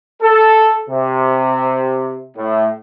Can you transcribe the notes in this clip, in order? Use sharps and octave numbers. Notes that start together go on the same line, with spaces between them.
A4
C3
A2